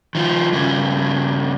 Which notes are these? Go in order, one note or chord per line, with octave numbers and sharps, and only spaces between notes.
D#3 F3
G2 C#3